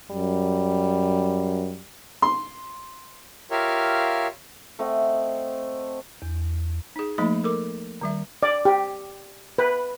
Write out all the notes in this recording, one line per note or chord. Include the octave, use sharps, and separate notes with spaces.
F#2 G3
C6
F4 G4 A#4 C#5 E5 F5
A3 C4 D#5 F#5
E2
D#4 G#4
F3 A3 A#3 D#4 D#5 B5
A4 A#4 D6
D#3 G3 E5
D5
G4
B4